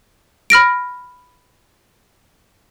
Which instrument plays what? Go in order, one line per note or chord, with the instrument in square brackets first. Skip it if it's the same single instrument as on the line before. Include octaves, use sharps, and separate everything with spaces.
[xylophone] B5 F6 A#6 D7